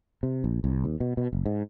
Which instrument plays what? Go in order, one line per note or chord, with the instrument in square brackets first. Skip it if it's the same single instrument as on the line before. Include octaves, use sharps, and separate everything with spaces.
[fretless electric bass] C3
A#1
C2
D#2
B2
B2
F#1
G#2